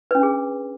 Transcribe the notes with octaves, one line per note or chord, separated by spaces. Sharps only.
C#4 D4 G#4 B4